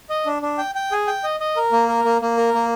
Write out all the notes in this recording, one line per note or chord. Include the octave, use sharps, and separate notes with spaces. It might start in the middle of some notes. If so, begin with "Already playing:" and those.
D#5
D4
D4
G5
G5
G#4
G5
D#5
D#5
A#4
A#3
A#4
A#3
A#3
A#4
A#3